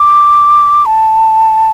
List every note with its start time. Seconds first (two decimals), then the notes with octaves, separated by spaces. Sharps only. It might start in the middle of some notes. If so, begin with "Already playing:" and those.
Already playing: D6
0.86 A5